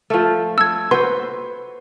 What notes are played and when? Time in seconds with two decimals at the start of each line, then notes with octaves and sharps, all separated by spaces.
0.10 F3 A3
0.58 A4 E6 G#6
0.91 F#4 B4 C5 C6